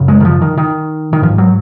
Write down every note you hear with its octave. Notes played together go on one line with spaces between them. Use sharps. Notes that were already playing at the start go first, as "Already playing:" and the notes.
Already playing: F#2 C#3
G#3
D#3
F3
D#3
D#3
D#3
G#2 F3
F#3